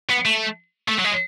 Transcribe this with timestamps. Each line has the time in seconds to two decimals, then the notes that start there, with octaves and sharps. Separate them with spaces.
0.10 B3
0.25 A3
0.88 A3
0.99 F#3
1.04 G#3